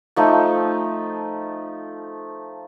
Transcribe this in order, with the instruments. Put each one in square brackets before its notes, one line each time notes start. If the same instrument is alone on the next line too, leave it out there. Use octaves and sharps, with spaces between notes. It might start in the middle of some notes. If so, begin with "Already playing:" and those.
[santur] F3 A3 D#4